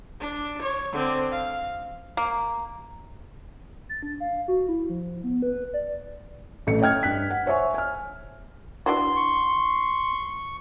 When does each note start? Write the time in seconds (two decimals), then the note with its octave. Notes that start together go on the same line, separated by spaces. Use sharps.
0.20 D4
0.62 C#5
0.93 D3 C4
1.31 F5
2.17 A#3
3.89 A6
4.03 D4
4.20 F5
4.48 F#4
4.68 E4
4.89 F3
5.24 B3
5.42 B4
5.74 D5
6.67 A1 A3 C#7
6.81 C#5 D#5 G5 F6 G#6
7.03 G2 F#6 B6
7.30 F#5
7.46 C5 C#5 E5 G#5 C#6
7.74 G#5 F6
8.86 E3 D4 F#4 C6
9.16 C#6